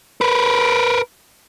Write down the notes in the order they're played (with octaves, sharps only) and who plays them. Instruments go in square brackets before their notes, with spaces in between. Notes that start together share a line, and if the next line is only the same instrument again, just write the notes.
[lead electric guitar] A#4 B4